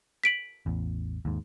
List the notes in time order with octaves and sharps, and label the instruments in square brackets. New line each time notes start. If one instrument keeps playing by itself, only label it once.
[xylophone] B6 D7 F#7
[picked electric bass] A1 E2
D#2 G#2